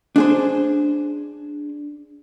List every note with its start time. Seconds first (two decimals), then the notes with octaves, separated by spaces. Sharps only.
0.16 D4 G#4 C5